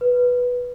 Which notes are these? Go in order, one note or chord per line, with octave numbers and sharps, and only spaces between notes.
B4